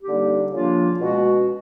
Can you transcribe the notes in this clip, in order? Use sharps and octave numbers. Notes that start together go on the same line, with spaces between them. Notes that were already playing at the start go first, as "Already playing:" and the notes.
D3 G3 A#3 D#4 G4
C#3 F3 A#3 D4 F4
B2 G#3 C#4 F#4